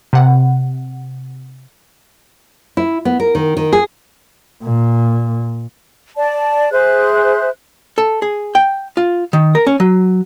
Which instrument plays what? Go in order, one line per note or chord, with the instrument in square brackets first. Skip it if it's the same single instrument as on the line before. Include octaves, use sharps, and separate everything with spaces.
[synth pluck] C3 F#5
[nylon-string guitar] E4
B3
A#4
D#3
D#3
G#4
[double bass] A#2
[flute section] D5 A5
G#4 C5 E5 F#6
[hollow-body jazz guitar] A4
G#4
G5
F4
D#3
A#4
C#4
F#3